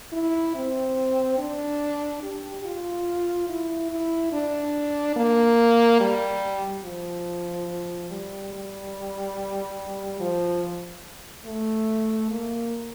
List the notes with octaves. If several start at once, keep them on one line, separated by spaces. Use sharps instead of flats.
E4
C4
D4
G4
F4
E4
E4
D4
A#3
G3
F3
G3
G3
F3
A3
A#3